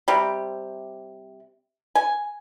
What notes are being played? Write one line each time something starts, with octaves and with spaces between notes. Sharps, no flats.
C3 G3
G#5